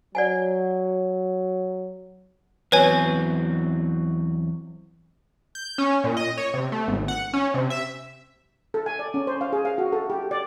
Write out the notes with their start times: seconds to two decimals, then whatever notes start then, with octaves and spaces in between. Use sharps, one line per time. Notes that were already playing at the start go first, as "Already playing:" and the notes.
0.15 F#3 D5 F#5 G#5
2.72 E2 F#3 C4 B4 C#5 G#5
5.55 G6
5.78 C#4
6.04 A#2
6.17 D#5
6.37 C#5
6.54 C3
6.72 A3
6.88 G#1
7.08 F#5
7.33 C#4
7.54 C3
7.70 E5
8.74 A4
8.86 G#5
8.99 D5
9.14 C#4
9.27 C5
9.41 F5
9.53 G#4
9.65 F5
9.78 F#4
9.93 A4
10.10 G4
10.31 D5